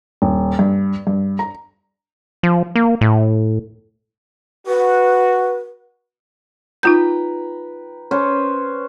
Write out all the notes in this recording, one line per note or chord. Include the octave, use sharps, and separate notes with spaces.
D#1
G2
G2
A#5
F3
A#3
A2
F#4 B4
D#4 F4 B4 G5 A#5 G6
C#4 B4 C5